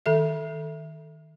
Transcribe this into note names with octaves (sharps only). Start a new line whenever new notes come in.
D#3 A4 E5